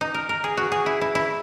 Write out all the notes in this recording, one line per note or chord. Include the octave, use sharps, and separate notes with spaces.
D#4
A#4
A#4
G#4
F#4
G#4
E4
E4
E4